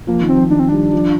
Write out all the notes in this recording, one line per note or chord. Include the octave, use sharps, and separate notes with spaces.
F3 A#3
D#3
C4
F3
D#3 D4
C4
G3 D4
F3